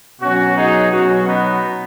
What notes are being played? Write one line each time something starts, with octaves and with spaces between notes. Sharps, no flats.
B2 F#3 C#4 F#4
D#4 G#4
B2 F#3 C#4 F#4
B3 D#4